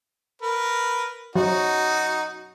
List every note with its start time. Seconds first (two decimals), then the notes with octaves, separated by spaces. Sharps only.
0.42 A#4 B4
1.36 F#3 D#4 F#4